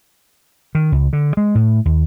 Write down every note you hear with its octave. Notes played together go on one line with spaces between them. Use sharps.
D#3
C#2
D3
G#3
A2
D#2